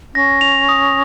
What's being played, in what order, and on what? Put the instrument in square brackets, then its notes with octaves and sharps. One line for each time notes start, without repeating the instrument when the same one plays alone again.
[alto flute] C#4 [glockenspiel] A#6
[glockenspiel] F7
D#6